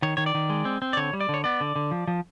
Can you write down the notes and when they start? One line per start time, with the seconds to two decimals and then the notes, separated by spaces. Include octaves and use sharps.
0.02 D#3 C#5
0.17 D#3 C#5
0.26 D5
0.35 D#3
0.50 G#3
0.65 C4
0.82 C4
0.93 D5
0.97 D3 C#5
1.13 G3
1.21 D5
1.29 D3
1.34 C#5
1.44 B3 D5
1.61 D3
1.76 D3
1.91 F3
2.07 F3